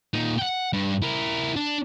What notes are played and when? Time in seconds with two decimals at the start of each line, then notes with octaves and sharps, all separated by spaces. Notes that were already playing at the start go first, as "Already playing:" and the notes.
0.14 A#2 D#4
0.39 F#5 G5
0.73 G2
1.02 E4 A#4
1.56 D4